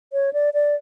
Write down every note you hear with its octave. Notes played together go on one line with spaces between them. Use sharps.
C#5
D5
D5